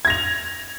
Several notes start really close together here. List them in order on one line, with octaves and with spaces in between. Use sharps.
G#6 A#6 F7